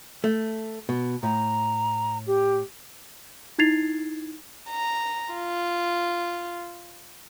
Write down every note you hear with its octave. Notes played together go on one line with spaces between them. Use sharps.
A3
B2
A2 A#5
G4
D#4 E4 G#6 A6 C7 F7
A#5
F4